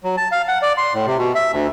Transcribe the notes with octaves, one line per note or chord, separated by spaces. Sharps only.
F#3
A5
F5
F#5
D5
C6
A2
C3
B2
E5
D2